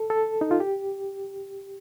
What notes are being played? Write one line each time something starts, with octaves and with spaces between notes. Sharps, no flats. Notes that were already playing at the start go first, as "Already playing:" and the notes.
Already playing: A4
A4
D#4
F4
G4